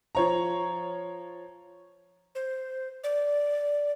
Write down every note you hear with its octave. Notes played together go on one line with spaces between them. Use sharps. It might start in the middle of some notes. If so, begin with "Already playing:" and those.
F3 C#5 A#5
C5
D5